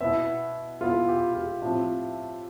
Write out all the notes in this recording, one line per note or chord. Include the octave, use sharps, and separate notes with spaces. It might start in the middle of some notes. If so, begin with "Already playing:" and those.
B2 B3 E4 E5
B2 B3 E4 F4
G4
F4
A2 F3 C4